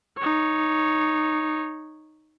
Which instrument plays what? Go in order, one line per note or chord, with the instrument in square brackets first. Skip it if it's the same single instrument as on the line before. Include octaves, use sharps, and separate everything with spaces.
[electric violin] D#4 C#5